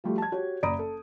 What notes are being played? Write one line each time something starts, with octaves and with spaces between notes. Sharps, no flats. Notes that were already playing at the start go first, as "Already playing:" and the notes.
F3 G3 A3 F#4
A5 G#6
F#4 G4 C#5
F#1 D5 A#5 B5 D#6 D7
A4